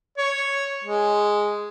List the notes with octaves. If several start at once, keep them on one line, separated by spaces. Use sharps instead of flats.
C#5
G#3